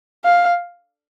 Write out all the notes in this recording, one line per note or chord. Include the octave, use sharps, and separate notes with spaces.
F5